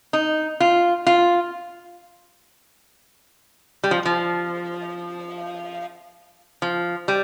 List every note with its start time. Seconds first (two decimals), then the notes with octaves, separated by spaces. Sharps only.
0.13 D#4
0.60 F4
1.06 F4
3.84 G3
3.91 F3
4.05 F3
6.62 F3
7.08 G3